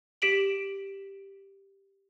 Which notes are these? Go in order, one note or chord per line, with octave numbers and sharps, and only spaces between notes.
G4 B6 D7 F#7